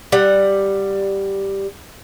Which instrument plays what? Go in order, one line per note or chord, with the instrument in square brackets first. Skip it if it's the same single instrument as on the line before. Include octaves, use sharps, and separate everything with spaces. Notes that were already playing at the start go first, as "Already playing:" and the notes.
[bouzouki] G3 F#5